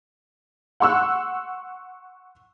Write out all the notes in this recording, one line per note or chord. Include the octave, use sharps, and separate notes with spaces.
F#5 C6 C#6 E6 F#6